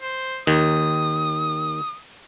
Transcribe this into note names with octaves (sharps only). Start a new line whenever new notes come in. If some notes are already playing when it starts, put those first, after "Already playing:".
C5
D#2 D#3 D#6